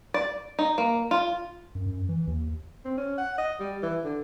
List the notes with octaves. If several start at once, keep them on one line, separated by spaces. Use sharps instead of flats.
D5
D#4
A#3
F4
F#2
F#2
E3
D#2
C4
C#4
F#5
D#5
G3
E3
D3